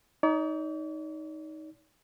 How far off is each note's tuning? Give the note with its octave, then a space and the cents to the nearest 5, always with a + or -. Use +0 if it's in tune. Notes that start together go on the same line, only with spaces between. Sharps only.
D#4 +10 D5 -45